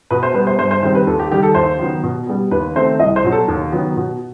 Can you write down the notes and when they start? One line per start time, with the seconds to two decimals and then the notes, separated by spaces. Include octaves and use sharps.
0.11 B2 B4
0.23 C5
0.34 G3 B4
0.38 B3
0.47 C5
0.59 G2 C5
0.71 C5
0.83 D#3 G3 C4 C5
0.95 B4
1.07 D#2 A4
1.19 G4
1.31 D#3 G3 G4
1.43 A4
1.55 D#2 C5
1.79 D#3 F#3 B3
2.03 B2
2.27 G3 B3
2.51 D#2 B4
2.75 D#3 A3 C4 C5
2.99 C2 D#5
3.16 C5
3.24 B2 F#3
3.32 A4
3.48 D#2
3.72 D#3 F#3 B3
3.97 B2